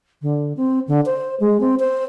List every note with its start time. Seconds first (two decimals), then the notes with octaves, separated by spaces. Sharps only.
0.22 D3
0.57 C4
0.88 D3
1.06 C5
1.40 G#3
1.60 C4
1.79 C5